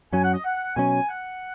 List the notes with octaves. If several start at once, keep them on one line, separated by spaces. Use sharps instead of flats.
F#2 F#3 C#4 G#5
F#5
D#5
F#5
B2 F#3 C#4 G#5
F#5